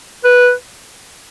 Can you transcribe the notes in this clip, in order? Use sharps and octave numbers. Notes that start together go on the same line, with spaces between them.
B4